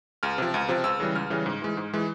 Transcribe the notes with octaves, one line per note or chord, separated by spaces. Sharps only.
C#2 F6
C3 F3
C#2
C3 F3
C#2 E6
C#3 E3 G3
C#2 F6
C#3 E3 G3
G#2
E3 G#3
G#2
E3 G#3